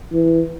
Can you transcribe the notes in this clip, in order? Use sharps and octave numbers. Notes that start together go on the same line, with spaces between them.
E3